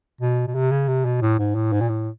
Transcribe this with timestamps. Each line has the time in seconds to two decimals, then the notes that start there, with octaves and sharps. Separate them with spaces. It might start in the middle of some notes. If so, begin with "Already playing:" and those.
0.21 B2
0.48 B2
0.55 C3
0.71 C#3
0.88 C3
1.06 B2
1.22 A2
1.39 G#2
1.55 A2
1.73 G#2
1.81 A#2
1.89 A2